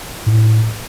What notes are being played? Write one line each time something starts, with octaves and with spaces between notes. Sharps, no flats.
A2